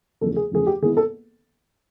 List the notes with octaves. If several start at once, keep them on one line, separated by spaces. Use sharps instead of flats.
E2 C#3 F3 A3 A4
G#4
E2 C#3 F3 A3 G#4
G4
D#3 G#3 B3 E4 G#4
A4